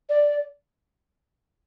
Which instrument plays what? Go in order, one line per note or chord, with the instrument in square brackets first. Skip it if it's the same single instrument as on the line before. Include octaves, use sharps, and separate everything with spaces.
[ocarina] D5